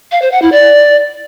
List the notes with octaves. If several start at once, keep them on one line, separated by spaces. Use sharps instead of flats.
F5
C5
F#5
E4
D5